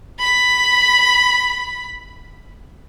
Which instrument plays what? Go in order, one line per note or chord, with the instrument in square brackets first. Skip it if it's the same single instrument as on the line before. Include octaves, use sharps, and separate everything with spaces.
[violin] B5 B6